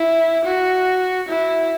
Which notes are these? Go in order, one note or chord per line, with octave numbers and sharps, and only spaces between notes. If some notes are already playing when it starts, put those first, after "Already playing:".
Already playing: E4
F#4
E4